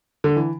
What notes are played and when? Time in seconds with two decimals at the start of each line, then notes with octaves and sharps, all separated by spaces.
0.24 D3
0.36 E3